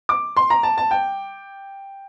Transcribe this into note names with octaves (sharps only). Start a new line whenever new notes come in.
D6
C6
A#5
A5
A5
G5